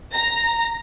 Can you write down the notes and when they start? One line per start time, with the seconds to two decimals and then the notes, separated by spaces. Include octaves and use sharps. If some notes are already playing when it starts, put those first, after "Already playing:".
0.14 A#5 A#6